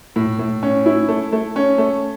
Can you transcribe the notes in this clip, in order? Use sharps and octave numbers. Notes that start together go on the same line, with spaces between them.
A2
A2
C#4
E4
A3
A3
C#4
A3